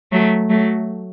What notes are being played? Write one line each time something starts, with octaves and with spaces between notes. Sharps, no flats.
F#3 A3
F#3 A3